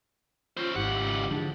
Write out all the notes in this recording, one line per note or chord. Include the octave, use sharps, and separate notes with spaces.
C#4 F4 C5
G#1 C#2 G#2 E4 G4 F#5
D3 E3 F3 D4 G#4